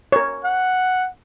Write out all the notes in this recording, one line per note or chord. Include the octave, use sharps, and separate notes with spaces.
A#4 C#5
F#5